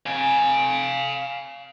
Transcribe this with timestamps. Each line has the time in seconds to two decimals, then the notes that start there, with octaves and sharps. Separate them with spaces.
0.06 F5 G#5